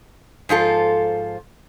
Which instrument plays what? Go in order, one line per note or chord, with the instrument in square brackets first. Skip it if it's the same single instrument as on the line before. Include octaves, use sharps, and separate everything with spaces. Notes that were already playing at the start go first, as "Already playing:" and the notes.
[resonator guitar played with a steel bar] G#2 F3 F4 A4